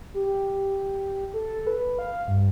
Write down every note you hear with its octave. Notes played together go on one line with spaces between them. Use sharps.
G4
A4
B4
F5
G2